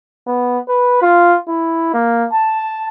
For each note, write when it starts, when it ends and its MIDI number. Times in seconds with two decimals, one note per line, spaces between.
0.27 0.58 59
0.68 1.01 71
1.02 1.37 65
1.48 1.89 64
1.94 2.26 58
2.33 2.86 81